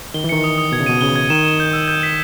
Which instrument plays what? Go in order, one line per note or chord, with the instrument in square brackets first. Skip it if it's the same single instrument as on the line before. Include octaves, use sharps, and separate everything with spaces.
[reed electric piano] D#3 [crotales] G7
[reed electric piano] E3
[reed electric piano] D#3 [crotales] C#7
[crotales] D#6
D#6
[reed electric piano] B2 [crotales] G#6
[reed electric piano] C#3
[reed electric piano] B2 [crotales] D#7
[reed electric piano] C#3 [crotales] G7
[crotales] G#6
[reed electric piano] D#3 [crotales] E7
[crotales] E7
G6
E6
G6
B6